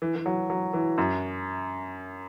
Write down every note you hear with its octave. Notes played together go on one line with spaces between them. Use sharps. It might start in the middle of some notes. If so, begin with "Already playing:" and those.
E3
E3
F#3
F#3
E3
F#2